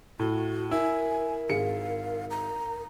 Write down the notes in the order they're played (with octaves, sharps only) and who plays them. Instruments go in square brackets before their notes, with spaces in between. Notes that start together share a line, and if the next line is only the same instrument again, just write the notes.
[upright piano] A2 [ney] F#4
[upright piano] E4 [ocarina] A#4 [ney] G#5
[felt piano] G#1 G#4 C#7 [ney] F5
[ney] A#5